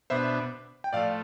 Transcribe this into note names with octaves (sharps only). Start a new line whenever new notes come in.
B2 B3 D4 C5 E5
G5
A2 F3 A3 D5 F5